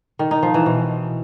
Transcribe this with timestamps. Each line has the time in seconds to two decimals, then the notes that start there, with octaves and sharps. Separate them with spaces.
0.19 D#3
0.31 D#4
0.43 F3
0.54 E3
0.66 B2